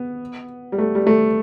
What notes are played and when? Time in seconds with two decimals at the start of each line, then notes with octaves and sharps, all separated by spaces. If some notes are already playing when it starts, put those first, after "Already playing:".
Already playing: B3
0.72 G3
0.78 A3
0.95 G3
1.07 A3